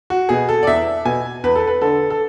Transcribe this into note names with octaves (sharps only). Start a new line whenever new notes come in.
F#4
B2 G#4
A4
D5
E2 E5
B2 G#5
E2 B4
A4
B4
D3 A4
A4